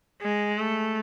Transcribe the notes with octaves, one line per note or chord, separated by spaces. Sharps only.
G#3
A3